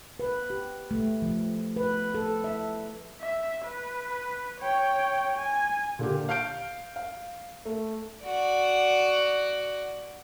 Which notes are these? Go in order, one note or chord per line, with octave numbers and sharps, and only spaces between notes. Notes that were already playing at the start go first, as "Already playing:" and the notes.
B4
G4
A3
F3
B4
A4
E5
E5
B4
C#5 G5
G#5
A#2 D3 G4
F5 F6 G6 D7
F5
A3
F#4 D5